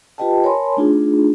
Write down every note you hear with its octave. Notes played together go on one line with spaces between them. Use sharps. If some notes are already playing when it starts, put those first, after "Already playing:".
F4 G4 B4 D#5 G5 A5
A#4 C#5 G#5 A5 B5 C6
A3 D4 D#4 F4 G#4